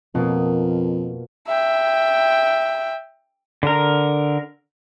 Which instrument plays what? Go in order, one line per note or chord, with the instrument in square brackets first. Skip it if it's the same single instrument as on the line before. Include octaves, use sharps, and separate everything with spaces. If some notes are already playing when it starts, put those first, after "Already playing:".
[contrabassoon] F2 [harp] B2 A#3 F4
[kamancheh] E5 G5
[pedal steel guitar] D3 A#4